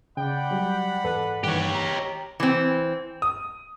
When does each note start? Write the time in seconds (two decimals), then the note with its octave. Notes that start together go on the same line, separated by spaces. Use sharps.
0.17 C#3 D5 F#5 G5 B5
0.51 F#3 G3 G4
1.04 E2 G#2 A4 B4
1.44 G2 D#3 E3 G4 C#5
1.75 G5 A#5
2.40 E3 C4
3.22 D#6